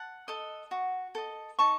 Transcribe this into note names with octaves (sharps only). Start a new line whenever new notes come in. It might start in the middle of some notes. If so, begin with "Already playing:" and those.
Already playing: F#5 A5
A4 D#5
F#4
A4 D#5
D#4 A5 C#6